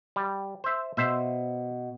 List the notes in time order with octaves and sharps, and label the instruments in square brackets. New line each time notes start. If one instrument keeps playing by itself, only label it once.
[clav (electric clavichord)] G3
C5 E5
[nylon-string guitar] B2 [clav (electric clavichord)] C5 E5